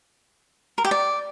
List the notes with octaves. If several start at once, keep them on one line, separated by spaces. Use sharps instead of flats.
A#4
G4
D5